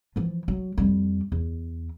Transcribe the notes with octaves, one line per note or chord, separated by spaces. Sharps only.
E3 F3
F#3
F2 G3
E2